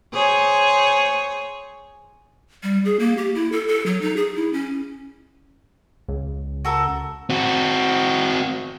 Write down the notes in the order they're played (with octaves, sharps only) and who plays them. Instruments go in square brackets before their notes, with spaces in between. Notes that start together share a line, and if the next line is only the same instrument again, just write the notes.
[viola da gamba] G#4 C5 C#5
[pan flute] G3
G#4
A#3
G4
E4
A4
A4
F#3
D#4
G#4
E4
C#4
[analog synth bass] C#2
[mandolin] F#4 A4 A#4
[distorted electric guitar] C4 F#4